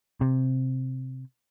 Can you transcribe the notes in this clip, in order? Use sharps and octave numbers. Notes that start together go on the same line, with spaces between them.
C3